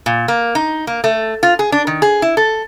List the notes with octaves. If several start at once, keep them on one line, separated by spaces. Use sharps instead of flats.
A#2
A#3
D#4
A#3
A3
F4
G#4
D4
D#3
G#4
E4
A4